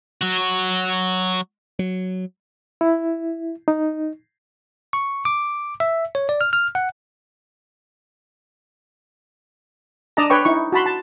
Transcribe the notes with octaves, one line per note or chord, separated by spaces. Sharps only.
F#3 F#4
F#3
E4
D#4
C#6
D6
E5
C#5
D5
F6
F6
F#5
D4 D5 D#5 A5 A#5
D4 B4 C#5 G5 C#6
D#4 E4 C#6
F#4 A5 B5 C6
A5